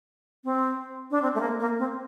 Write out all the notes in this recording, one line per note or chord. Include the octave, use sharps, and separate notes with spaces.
C4
D4
C4
A3
A#3
A#3
C4